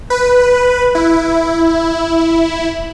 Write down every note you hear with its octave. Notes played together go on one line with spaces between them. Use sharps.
B4
E4